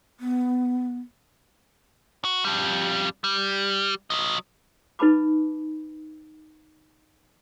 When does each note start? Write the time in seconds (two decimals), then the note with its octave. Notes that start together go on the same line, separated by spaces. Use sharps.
0.20 B3
2.25 F#4
2.45 F2 G3
3.24 G3
4.10 F#3 D#5
4.99 D#4 B4 A5 B5 D6